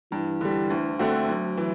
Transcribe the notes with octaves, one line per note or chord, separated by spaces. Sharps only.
G2 E3
D3 G3
D2
D3 A3 C4 F#4
D2 F#3
E3